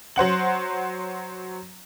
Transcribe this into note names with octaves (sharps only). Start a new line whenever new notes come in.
F#3 C5 F#5 F#7